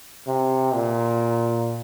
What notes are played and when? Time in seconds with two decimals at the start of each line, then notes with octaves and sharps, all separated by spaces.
0.27 C3
0.75 A#2